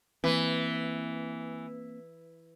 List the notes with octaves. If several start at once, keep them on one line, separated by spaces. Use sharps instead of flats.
E3 A#3 C4